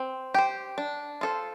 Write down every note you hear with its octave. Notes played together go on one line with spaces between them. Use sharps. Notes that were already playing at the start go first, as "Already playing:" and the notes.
Already playing: C4
G4 C5
D4
F4 A4 C5